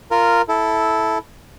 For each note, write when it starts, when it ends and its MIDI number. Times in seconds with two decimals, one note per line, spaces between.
0.11 0.42 65
0.11 0.42 70
0.49 1.18 64
0.49 1.18 69